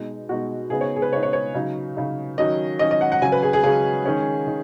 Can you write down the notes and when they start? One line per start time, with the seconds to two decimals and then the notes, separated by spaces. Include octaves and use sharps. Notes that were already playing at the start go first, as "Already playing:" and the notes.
Already playing: B2 G#3 D#4
0.29 B2 G#3 D#4 F#4
0.70 C#3 B3 D#4 G#4
0.81 C#5
0.96 G#4
1.02 B4
1.12 C#3 B3 D#4 C#5
1.23 C#5
1.33 C#5
1.54 C#3 F#3 D#4
1.97 C#3 F#3 D#4
2.38 D#3 F#3 C#4 D#5
2.79 D#3 F#3 C#4 D#5
2.91 D#5
3.01 F#5
3.12 F#5
3.22 C#3 F#3 C#4 G#5
3.32 B4
3.42 G#4
3.53 G#4
3.63 C#3 F#3 C#4 G#4
4.06 D#3 G#3 C#4
4.47 D#3